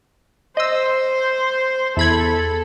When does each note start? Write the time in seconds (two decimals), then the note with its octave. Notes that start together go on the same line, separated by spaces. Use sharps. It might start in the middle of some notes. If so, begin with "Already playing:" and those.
0.57 C5 D#5 E6
1.97 E2 A4 B5 G#6